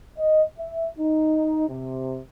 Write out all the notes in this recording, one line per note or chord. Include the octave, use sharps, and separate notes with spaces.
D#5
E5
D#4
C3